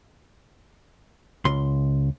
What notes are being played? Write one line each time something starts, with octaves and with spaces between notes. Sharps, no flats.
C#2 C6